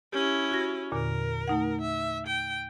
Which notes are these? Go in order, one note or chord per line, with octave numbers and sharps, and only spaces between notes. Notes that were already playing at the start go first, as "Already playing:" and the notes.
C#4 E4 G4
F#4 G#6 A#6
E2 A#2 D3 A#4
A3 D#4 F#5
E5
G5